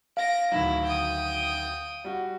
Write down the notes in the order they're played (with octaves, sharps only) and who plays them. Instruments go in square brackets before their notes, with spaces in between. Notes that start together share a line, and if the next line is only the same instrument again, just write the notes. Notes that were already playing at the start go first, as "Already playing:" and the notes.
[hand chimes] F5 [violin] A#6 D7
[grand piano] D2 D#3 F#3 [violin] E4
[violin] G5 D#6
[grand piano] G3 F#4